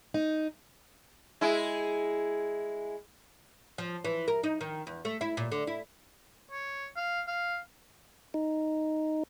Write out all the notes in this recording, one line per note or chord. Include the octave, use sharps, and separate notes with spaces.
D#4
G#3 E4
F3
E3
A#4
D#4
D#3
E2
A3
E4
A#2
D3
E4
C#5
F5
F5
D#4